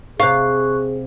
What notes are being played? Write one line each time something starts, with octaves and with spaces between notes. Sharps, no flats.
C3 G#4 F5 C#6 F#6